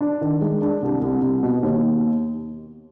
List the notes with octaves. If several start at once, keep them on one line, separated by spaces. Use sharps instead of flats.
D4
D#3
G#3
D4
C2
C2
C2
B2
D#2